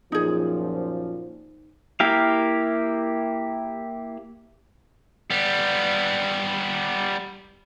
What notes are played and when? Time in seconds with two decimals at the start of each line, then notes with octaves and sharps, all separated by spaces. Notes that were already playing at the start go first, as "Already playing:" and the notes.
0.12 F#2 A#2 F3 D#4 G#4
2.00 A#3 E4 G4 A#4 F5
5.30 G3 B3